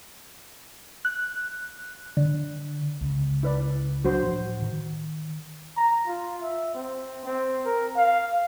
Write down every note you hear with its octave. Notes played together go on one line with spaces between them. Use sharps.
F#6
D3
C#2
E4 B4 D5
F#3 D4 F#4 C5 C6
A2 F3
D#3
A#5
F4
E5
C4
C4
A#4
F5